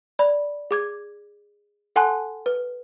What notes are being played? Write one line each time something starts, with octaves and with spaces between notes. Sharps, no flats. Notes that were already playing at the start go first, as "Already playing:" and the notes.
D5 B5
G#4 D6 G#6
A4 F#5 G#5 A5 C6 F#6
B4